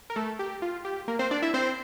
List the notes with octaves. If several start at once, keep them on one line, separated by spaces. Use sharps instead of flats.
A#4
A3 A4
G4
F4
G4
A#3 A#4
C4 C5
D4 D5
E4 E5
C4 C5